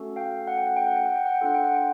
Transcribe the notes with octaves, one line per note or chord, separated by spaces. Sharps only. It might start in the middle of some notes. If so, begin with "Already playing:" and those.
Already playing: A3 C#4 F#4 A4
F5 G5
F#5
G5
F#5
G5
F#5
G5
F#5
G5
F#5
G5
D4 F4 A4 F#5
G5
F#5
G5